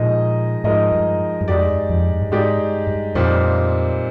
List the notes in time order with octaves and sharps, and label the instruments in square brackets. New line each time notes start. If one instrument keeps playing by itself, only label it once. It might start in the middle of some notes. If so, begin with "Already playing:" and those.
Already playing: [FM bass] A#2 [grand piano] F3 G#3 D#4 A#4 D#5
[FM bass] G#2 [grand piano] F3 G#3 D#4 A#4 D#5
[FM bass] G2
G2
[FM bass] F2 [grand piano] G#3 D#4 G4 D5
[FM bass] G2
F2
G2
G2
[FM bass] G#2 [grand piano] G#3 D#4 G4 D5
[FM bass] G2
G2
[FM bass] F2 [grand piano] A#2 G3 C4 D#4